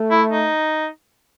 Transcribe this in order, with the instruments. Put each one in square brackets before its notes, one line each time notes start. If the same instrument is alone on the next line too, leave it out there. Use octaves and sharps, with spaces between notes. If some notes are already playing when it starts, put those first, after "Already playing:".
Already playing: [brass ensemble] A3
[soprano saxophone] E4
D#4